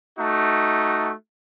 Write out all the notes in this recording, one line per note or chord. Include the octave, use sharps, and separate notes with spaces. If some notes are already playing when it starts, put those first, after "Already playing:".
A3 D#4 F#4